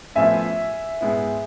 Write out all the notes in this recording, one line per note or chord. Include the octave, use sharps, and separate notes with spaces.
A1 A2 F3 B3 F4 E5 G#5
G#2 G#3 B3 E4